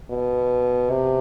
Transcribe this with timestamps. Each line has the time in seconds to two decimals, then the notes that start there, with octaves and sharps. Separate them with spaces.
0.10 B2
0.90 C3